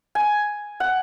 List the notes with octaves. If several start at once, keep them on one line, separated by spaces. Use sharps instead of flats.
G#5
F#5